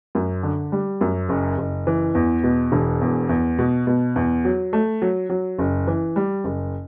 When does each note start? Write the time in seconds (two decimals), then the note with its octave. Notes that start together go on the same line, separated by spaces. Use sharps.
0.15 F#2
0.43 D3
0.72 G3
1.01 F#2
1.29 F#1
1.58 F#1
1.87 E3
2.15 E2
2.44 B2
2.72 E1
3.01 E2
3.29 E2
3.59 B2
3.87 B2
4.16 E2
4.45 F#3
4.73 A3
5.02 F#3
5.30 F#3
5.58 F#1
5.87 E3
6.16 G3
6.44 F#1